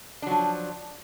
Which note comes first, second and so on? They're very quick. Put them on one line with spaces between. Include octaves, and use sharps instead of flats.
D4 F#3 F3